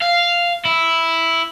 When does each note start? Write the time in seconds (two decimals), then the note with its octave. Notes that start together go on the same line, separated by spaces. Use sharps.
0.02 F5
0.65 E4